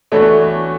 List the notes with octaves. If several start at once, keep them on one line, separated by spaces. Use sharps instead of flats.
E3 A3 B3 D4 F#4 C#5